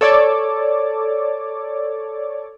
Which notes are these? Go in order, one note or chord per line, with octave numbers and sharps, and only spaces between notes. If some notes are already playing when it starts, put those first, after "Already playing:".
A4 C#5 D5 D6